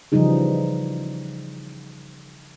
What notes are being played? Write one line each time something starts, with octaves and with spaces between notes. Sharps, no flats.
C#3 E3 F3 G3 D#4 G#4